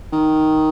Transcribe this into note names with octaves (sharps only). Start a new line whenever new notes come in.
D#3